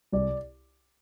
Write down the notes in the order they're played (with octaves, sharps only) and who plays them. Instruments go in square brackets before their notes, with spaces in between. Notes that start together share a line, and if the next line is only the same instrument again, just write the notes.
[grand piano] C2 D5